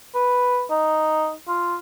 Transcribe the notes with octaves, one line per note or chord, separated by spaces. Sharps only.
B4
D#4
F4